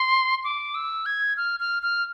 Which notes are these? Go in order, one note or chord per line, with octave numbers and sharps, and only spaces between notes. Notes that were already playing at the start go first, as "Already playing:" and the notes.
Already playing: C6
D6
E6
G#6
F6
F6
F6